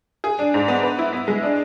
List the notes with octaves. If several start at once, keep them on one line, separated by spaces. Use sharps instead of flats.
G#4
D4
G#2
B3
B4
E4
B3
G#3
D4